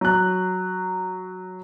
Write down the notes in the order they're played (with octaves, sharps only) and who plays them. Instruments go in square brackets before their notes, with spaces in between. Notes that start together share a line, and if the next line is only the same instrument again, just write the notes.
[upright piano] F#3 F#6